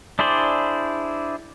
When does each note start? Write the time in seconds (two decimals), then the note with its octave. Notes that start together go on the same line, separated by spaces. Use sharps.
0.19 D4 E4 G#4 C5 D5